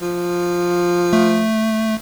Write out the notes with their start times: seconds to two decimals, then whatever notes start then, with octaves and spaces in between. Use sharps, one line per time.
0.02 F3
1.13 A3